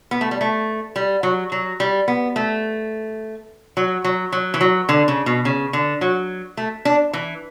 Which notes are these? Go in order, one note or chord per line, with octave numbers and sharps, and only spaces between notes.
B3
A3
G3
A3
G3
F#3
F#3
G3
B3
A3
F#3
F#3
F#3
E3
F#3
D3
C#3
B2
C#3
D3
F#3
A3
D4
E3